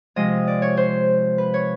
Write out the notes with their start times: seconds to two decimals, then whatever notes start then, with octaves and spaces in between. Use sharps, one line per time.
0.16 C3 F3 G#3 D#5
0.47 D5
0.62 C#5
0.77 C5
1.38 B4
1.54 C#5